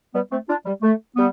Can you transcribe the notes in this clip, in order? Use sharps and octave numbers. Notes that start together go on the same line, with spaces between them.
G3 B3
A3 C4
D4 F4
G3
A3
G3 B3